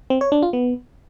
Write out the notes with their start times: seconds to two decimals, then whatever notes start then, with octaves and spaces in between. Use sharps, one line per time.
0.10 C4
0.21 C#5
0.32 D4
0.43 F4
0.53 B3